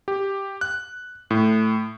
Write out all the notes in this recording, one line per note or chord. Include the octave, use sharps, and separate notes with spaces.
G4
F#6
A2